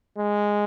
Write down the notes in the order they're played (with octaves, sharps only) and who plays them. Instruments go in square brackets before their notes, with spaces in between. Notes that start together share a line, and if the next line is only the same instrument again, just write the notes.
[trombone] G#3